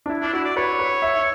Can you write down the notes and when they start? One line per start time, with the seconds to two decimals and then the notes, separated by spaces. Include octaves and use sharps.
0.06 D4
0.09 E4
0.22 D4
0.33 E4 F#4
0.45 D5
0.56 B4 C#5
0.79 B4
1.02 E5